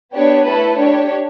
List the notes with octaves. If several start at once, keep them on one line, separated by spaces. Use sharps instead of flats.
B3 D4 G4 C#5
A3 E4 A4 B4
D4 G4 C#5